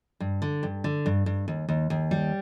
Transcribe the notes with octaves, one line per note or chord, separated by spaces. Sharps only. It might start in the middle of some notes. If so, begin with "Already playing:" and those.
G2
D3
G2
D3
G2
G2
D#2
D#2
D#2
G3